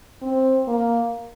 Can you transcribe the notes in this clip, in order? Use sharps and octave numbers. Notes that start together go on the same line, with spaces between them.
C4
A#3